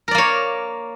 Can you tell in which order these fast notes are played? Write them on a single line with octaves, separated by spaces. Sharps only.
A#4 D5 A#3 C#5